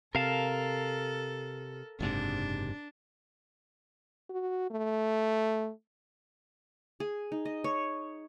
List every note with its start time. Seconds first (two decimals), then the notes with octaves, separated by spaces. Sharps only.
0.15 C3 A4 A#4 F5 A5
2.00 F#1 G#2 C3 D4
4.30 F#4
4.71 A3
7.00 G#4
7.32 D#4
7.45 D#5
7.64 C#5